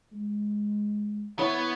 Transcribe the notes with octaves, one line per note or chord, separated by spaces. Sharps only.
G#3
B3 E4 C#5